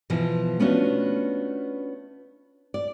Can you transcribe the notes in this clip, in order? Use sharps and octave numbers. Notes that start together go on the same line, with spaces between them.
B2 E3 F3
A3 B3 C#4 D4 F4 F#4
D5